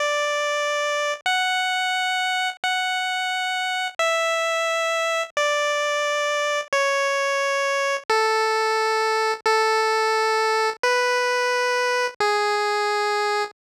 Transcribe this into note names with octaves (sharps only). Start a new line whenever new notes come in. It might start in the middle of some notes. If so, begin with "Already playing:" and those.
Already playing: D5
F#5
F#5
E5
D5
C#5
A4
A4
B4
G#4